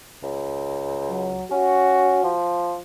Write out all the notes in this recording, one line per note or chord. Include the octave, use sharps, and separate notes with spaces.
C#2
F#3
C#4 F#4
F3